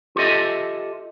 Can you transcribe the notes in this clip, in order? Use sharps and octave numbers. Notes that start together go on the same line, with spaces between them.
F4 G4 A4 D#5 E5